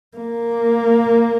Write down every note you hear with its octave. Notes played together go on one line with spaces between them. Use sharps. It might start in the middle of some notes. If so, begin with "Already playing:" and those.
A#3